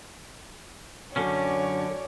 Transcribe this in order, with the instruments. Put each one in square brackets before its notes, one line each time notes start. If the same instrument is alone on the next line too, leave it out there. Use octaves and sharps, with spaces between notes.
[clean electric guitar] F#2 D3 C#4 [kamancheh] C#5 D5